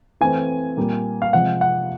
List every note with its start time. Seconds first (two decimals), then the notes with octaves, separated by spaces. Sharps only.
0.21 E3 A3 C4 G#5
0.77 A#2 G3 A#3
1.22 F5
1.33 C3 F3 G#3 F#5
1.61 F#5